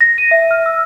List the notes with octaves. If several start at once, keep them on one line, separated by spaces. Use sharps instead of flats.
A#6
D#7
E5
F6
E6